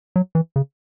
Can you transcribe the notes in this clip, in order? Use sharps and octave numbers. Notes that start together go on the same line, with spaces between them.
F#3
E3
C#3